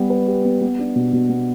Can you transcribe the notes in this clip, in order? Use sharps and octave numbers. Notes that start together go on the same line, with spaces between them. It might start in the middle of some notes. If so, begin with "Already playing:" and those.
Already playing: G3 B3 G4
B4
G4
B3
B3
D4
B2
B2
B3